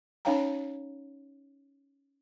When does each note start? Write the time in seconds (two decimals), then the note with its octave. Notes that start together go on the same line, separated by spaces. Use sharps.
0.25 C#4 D#4 C#5 F5 G5 A#5